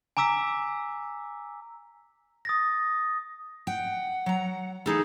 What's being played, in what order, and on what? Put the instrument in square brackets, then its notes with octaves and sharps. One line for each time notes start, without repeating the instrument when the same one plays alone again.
[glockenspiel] G#5 A#5 D6 E6 B6
D#6 A6 A#6
[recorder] F#5 [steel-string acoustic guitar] G5
[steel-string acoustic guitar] F#3 A#5
[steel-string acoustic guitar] E3 D#4 A4 [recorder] G#4